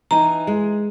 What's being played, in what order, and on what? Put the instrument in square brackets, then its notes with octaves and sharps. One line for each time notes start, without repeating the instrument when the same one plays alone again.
[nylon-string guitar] E3 D#4 [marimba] A#5
[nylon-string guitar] G#3